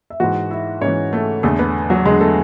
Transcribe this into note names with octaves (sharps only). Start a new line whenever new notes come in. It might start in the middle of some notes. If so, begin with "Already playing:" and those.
E5
G#2 E3 F#4 F#5
E4 E5
G#2 E3 C#4 C#5
A3 A4
E2 D3 A3 A4
B3 B4
F#3 F#4
E2 D3 G#3 G#4
A3 A4